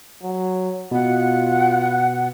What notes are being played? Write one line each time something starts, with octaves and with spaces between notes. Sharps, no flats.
F#3
B2 F4 F#5